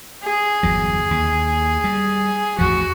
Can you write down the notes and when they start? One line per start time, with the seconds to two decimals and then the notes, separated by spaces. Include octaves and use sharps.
0.24 G#4
0.63 G1 E2 F#3
1.11 D#2
1.84 G3
2.58 A1 E2 F3 F#4